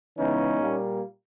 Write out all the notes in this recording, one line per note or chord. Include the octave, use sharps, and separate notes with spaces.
C#3 E3 G#3 B3 C#4 D#4
A#2 G3 A#3